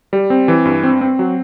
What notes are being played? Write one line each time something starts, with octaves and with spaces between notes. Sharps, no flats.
G3
C4
E3
G2
C4
C4
F#3